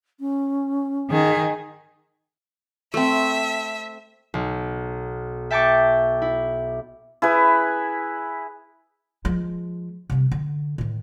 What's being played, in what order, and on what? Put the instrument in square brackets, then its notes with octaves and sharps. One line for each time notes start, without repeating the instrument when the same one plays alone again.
[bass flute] C#4
[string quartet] D#3 G#4
[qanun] A3 C4 [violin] E5
[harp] B1
E5 G5 A5 C#6 D6
E4
[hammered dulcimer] E4 G#4 B4
[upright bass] F3 G#3
C3 G3
D3
A2 D#3